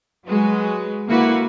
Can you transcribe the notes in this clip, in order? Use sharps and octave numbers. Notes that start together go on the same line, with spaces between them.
F#3 G#3 F#4 B4
D3 A#3 E4 F#4 B4